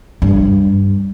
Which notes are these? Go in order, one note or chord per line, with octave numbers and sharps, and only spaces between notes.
G2